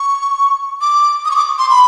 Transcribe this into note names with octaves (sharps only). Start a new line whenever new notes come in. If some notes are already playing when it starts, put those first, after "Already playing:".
Already playing: C#6
D6
D#6
C#6
D6
C6
B5